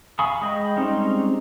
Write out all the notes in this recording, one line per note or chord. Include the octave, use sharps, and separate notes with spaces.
F5 G#5 B5 C#6 D#6
G#3 D#5 G5 B5
G3 G#3 C4 C#4 D#4